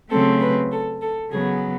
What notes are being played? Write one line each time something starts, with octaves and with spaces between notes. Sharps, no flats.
C#3 F#3 A3 C4 A4
B4
A4
A4
C#3 F#3 B3 G#4